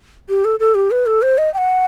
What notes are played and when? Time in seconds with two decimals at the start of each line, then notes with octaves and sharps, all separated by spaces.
0.29 G4
0.45 A4
0.60 A4
0.75 G4
0.91 B4
1.06 A4
1.22 C5
1.38 D#5
1.54 G5
1.58 F#5